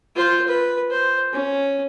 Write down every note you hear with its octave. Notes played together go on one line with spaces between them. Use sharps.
F4 C5
B4
C5
C#4